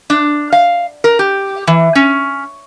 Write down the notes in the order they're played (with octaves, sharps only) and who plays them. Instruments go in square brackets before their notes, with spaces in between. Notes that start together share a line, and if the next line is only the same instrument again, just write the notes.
[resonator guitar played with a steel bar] D4
F5
A#4
G4
E3
C#4